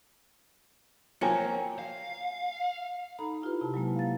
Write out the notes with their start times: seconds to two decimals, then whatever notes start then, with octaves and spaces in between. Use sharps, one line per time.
1.21 F3 F#3 A#3 C4 C#5 G5 G#5 A#5
1.79 F5
3.19 D#4 A4 A#5 B5
3.42 E4 F4 G4 B4
3.61 C3 A5
3.74 F#3 G#3 A#3 E4
3.96 F5 A6